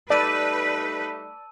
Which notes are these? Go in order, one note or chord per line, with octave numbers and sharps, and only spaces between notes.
G3 A3 D#4 B4 D5 A5 E6 D#7